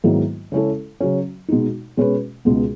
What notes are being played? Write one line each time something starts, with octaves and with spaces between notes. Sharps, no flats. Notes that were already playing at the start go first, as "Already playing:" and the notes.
G#2 D#3 F#3 B3 E4
C#3 G#3 C#4 E4 A4
C#3 F#3 C#4
B2 G#3 D#4
B2 G#3 C#4 G#4 B4
C#2 B2 G#3 B3